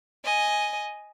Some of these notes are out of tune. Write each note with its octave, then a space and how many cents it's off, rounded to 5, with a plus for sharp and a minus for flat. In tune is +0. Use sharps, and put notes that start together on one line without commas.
D#5 +0 G#5 +0